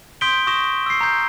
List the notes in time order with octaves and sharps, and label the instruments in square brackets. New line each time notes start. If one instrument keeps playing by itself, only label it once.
[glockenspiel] C6 D#6 G6 B6 D7 G7
C#6 D#6 A#6 E7 G7
E6 C7
A#5 G6